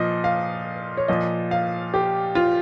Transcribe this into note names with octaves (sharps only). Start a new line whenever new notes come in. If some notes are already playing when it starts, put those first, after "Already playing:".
Already playing: A#2 F3 D#5
F5
C#5
A#2 F3 D#5
F5
G4
F4